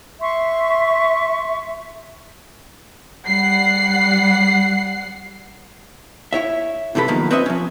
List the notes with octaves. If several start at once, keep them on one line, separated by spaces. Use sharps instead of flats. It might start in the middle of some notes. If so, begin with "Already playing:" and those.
E5 C6 C#6
G3 F#5 C7
E4 C#5 E5
G#2 C3 E3 A4 B5
B1 B2 D#3 F3 A#3
C4 B4 C#5 D#5 E5
F3 C#4